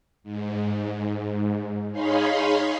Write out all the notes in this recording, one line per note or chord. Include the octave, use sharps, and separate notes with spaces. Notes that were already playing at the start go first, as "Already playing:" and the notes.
G#2
D#4 G#4 C#5 F5 B5 C6